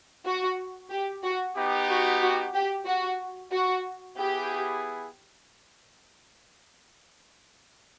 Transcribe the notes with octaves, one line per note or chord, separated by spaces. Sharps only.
F#4
G4
F#4
B3 D#4 G4
F#4
F#4
G4
F#4
F#4
B3 E4 G4 G#4